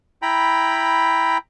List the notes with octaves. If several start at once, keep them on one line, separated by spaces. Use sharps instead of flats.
E4 G5 A#5 B5